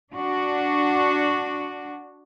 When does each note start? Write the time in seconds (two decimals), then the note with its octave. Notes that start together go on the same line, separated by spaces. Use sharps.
0.13 D4 F#4